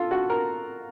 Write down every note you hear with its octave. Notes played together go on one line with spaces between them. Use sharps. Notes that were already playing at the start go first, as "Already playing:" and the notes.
Already playing: F4 A4
F#4
A#4